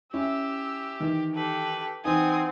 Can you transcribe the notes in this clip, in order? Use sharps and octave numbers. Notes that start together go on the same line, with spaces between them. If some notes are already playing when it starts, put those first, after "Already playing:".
C#4 E4 G4 E6
D#3 E3
G4 A4 B4
E3 C4 D#4 F#5 G#5 D#6